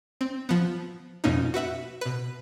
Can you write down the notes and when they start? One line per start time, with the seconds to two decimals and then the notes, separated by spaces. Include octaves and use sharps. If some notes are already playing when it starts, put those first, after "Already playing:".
0.21 C4
0.49 F3 B3
1.24 F2 B2 A#3 C#4 D#4
1.54 F#4 B4 E5 F#5
2.01 B2 B4